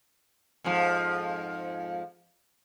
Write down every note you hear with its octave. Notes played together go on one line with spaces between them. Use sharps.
F2 G#2 F3